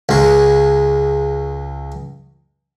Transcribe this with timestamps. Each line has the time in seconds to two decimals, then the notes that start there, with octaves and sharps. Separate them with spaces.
0.09 C#2 G#3